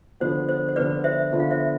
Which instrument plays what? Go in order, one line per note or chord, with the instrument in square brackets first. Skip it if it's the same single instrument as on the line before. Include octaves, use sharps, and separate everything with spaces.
[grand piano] D3 F3 B3 F4 [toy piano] C5
[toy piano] C5
C5
[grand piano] D3 F3 B3 F4 [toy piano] B4 D5
[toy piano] C5 E5
[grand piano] D3 F3 B3 F4
[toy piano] F5
C5 E5